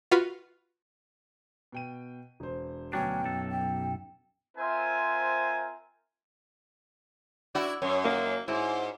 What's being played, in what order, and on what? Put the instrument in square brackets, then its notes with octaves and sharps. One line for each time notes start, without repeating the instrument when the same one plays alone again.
[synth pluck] F4 F#4 B4 F5
[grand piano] B2 G5 D#7
E1 C5
[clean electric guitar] D2 C#4 D4 [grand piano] B2 F#3 [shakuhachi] G5
[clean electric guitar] B1 F#2 A4
[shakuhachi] G5
[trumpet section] C4 F4 A#4 C5 E5 G#5
[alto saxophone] D4 [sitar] E4 F#4
[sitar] F#2 [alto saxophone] C#5
[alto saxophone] A#3
[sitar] G#2 [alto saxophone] E4